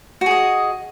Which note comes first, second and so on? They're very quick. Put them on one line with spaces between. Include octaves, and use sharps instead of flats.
F#4 G#4 D#5